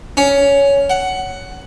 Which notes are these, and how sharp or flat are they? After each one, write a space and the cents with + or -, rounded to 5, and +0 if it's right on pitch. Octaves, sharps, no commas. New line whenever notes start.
C#4 +10
F#5 +10